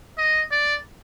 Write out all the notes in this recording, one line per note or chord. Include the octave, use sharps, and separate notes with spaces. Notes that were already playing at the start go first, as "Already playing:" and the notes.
D#5
D5